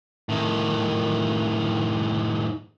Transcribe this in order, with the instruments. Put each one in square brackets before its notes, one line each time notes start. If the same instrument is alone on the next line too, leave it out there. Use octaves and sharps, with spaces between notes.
[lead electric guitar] A2 D#3